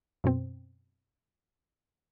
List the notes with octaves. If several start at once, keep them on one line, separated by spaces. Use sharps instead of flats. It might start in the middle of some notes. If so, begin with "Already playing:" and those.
F#2 B2 C4